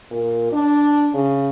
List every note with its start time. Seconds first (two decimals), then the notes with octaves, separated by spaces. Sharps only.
0.11 A#2
0.52 D4
1.14 C#3